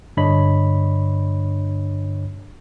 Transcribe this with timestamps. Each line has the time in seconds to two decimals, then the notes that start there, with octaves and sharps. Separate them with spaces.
0.17 G2 D3 D4 C#5 D#5 B5